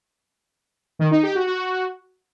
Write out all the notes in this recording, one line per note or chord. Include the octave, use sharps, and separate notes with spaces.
D#3
D#4
G4
F#4
F#4